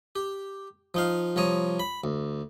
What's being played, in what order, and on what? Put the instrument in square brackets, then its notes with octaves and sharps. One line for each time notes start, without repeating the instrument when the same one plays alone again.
[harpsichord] G4
F3 D#4 F5
C2 F3 C#5 A#5 D#6
B5
D2